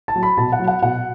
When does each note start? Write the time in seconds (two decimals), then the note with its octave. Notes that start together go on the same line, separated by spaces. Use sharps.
0.08 A5
0.15 F#3
0.23 B5
0.37 B2 A5
0.52 F#5
0.60 F#3
0.68 F#5
0.82 B2 F#5